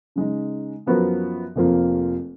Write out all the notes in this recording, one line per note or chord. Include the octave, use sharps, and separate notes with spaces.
C#3 G#3 D#4
F#2 F3 B3 F#4 A#4
F1 F2 F3 A#3 F4